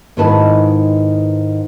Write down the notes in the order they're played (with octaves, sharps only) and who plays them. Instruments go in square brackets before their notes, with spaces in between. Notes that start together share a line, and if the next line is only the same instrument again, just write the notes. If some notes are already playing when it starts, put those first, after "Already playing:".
[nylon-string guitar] G#2 D#3 D#4 E4 B4 A5